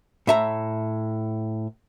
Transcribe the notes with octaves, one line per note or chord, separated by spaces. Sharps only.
A2 E5 A#5